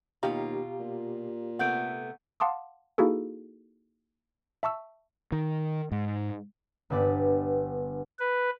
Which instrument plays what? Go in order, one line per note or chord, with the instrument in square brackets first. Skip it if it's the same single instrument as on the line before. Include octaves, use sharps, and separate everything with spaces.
[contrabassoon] D#2 [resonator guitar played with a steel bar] B2 F4 [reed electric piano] G4 F5 A#5
[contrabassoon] A#2
[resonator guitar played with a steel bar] C3 A3 B3 [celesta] F#5 G6 D7
[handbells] F5 F#5 A5 C6 D6 D#6
A#3 D#4 E4 F#4 G#4 A4
E5 A5 C#6 E6
[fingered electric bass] D#3
G#2
[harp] G1 G2 B3 G4 D5
[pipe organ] B4